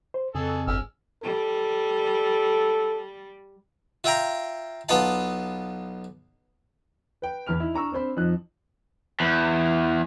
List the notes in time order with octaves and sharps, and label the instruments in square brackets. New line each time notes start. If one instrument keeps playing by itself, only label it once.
[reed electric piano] C5
[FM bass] F2 [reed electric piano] C#3 [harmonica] G#4 A4
[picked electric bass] G1 [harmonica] G#4 E6 F6
[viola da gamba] G3 [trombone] A4
[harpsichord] F4 E5 F5 G5 A#5
B1 B3 F4 F5 A5
[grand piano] B4 G5
E2 E3 B5 F6 F7
D#4 E4
D4 A#5 C#6 E6
C4 D4 C5 B5
F2 F3 D#4 F#6
[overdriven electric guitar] E2